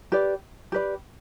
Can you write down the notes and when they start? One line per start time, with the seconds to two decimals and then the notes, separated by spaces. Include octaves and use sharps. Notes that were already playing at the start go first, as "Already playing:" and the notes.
0.12 G4 B4 D5
0.72 G4 B4 D5